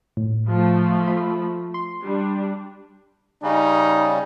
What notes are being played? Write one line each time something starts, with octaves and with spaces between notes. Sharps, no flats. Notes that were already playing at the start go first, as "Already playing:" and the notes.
A2
F3 A3
B5
C6
G3 D4
C#3 G3 C#4 D#4